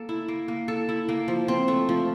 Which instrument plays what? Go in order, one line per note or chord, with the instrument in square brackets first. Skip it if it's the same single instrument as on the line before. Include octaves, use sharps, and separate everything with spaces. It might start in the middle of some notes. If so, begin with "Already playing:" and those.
Already playing: [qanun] A#3 A4
E4
A#3
A#3
A4
E4
A#3
F3
C4
A3
F3